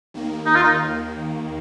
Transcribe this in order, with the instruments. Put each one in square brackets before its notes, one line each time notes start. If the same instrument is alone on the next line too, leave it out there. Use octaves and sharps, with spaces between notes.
[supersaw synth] D#2 D#3 A#3
[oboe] D#4
F4
D#4